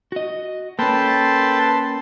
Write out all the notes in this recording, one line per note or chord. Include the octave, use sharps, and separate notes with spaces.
F#4 D#5
A#3 C#4 A4 B4 G5 A5 C6